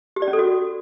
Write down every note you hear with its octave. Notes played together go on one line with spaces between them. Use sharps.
G4
D5
C#4
A4
F#4